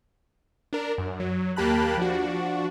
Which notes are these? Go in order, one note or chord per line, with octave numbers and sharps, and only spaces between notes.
D4 A#4
F#2
F#3
D#2 A#3 G4 A5 B5 F#6
F3 D4 F#4